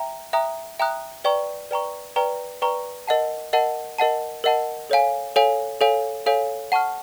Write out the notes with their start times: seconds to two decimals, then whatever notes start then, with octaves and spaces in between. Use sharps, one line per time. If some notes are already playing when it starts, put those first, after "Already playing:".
Already playing: E5 G5 A#5
0.33 E5 G5 A#5 D#6 F#6
0.79 E5 G5 A#5 D#6 F#6
1.24 B4 D5 G5 A#5 C#6
1.71 B4 D5 G5 A#5 C#6
2.16 B4 D5 G5 A#5 C#6
2.62 B4 D5 G5 A#5 C#6
3.07 A#4 D#5 F#5 A5
3.53 A#4 D#5 F#5 A5
3.98 A#4 D#5 F#5 A5
4.44 A#4 D#5 F#5 A5
4.90 A4 C#5 F5 G#5
5.36 A4 C#5 F5 G#5
5.81 A4 C#5 F5 G#5
6.26 A4 C#5 F5 G#5
6.72 F#5 A5 C#6 F6